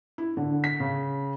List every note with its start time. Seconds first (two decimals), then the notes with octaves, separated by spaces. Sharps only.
0.18 E4
0.37 D3
0.64 B6
0.80 C#3